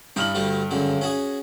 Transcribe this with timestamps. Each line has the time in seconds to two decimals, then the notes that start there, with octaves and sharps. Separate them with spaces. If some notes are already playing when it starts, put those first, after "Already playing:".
0.16 G2 D#4 E4 F6 F#7
0.35 D2 G3 A3
0.71 C#2 F#2 D3
1.01 C#4 F#4 G#4